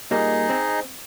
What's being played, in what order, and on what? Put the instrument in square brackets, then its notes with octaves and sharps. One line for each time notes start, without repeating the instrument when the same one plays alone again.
[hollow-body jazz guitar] A#2 G3 A#3 [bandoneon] D#4 G#4 D#5
[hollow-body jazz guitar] C4